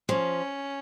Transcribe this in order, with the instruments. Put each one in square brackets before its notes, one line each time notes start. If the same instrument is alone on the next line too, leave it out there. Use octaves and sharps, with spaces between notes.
[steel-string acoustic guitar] F3 [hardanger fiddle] C#4